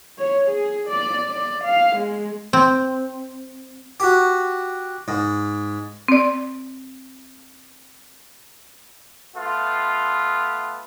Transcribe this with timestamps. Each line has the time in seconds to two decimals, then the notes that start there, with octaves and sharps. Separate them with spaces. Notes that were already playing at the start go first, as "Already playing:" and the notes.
0.18 C#5
0.48 G#4
0.88 D5
1.27 D5
1.64 F5
1.96 G#3
2.53 C4
4.00 F#4 G4
5.08 G#2
6.08 C4 D5
9.36 A3 B3 F4